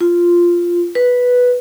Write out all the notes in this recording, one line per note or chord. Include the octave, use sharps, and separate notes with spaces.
F4
B4